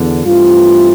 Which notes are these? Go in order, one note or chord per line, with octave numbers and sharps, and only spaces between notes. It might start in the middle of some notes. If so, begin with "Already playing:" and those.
Already playing: E2 D3
G2 E3 A3 C4 F4